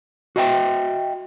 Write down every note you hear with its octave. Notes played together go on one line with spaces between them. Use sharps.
F#4 D#5 E5 G5